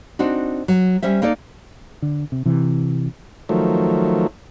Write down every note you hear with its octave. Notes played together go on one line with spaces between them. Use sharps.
C4 D4 D#4 F#4
F#3
G3 C#4 C5 E5
A#3 D#4 A4 D5
D3
C3
C3 E3
D#3 F3 F#3 A3